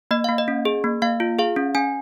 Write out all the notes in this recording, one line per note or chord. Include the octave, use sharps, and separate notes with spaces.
A#3 D#5
A#3 F5
D#5
C#4
G#4
A#3
A#3 F5
F4
G#4 F5
C#4
C#4 G#5